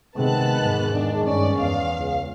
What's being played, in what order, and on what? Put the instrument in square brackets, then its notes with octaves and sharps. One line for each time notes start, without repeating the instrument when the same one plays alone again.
[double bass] C3 [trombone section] D#3 G#3 [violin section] B3 A5 F#6
[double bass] E2 G#2
[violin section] D4
[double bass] G2 C#4 [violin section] D5
[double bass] E2 [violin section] F5
[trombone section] C#2